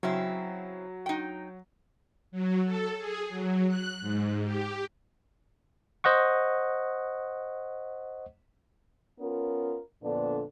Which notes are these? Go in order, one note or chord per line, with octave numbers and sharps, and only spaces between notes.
C#3 F#3 C4 E4
D#4 G5
F#3
A4
G#4
F#3
F#6
G#2
G4
C5 D#5 F#5 C#6
B3 C#4 F4 A#4
F2 A#2 D3 B3 D4